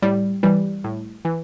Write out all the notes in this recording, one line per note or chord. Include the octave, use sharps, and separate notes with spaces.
A2 G3
E3 G3
A2
E3